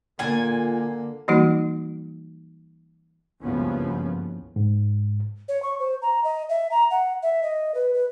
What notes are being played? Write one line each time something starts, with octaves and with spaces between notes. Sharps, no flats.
A#2 D3 A#3 G#5
E3 F#3 G3 A#3 D#4 F#4
F#1 C#2 G2 F3 B3 C#4
G#2
C#5
C#6
C5
A#5
D#5
E5
A#5
F#5
E5
D#5
B4
B4